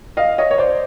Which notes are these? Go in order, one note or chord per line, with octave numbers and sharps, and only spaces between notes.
D#5 F5
C#5 D#5
C#5
C5 D5